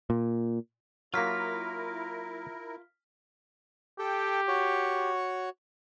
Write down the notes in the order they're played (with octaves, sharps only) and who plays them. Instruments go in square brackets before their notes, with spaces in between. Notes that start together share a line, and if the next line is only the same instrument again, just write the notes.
[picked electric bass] A#2
[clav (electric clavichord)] F#3 A#3 [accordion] E4 A#4 [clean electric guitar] F4 [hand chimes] F6 B6
[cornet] G4 [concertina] A4 G5
[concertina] F#4 C#5